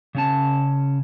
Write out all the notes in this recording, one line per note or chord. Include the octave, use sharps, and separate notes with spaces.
C#3 C#4 A5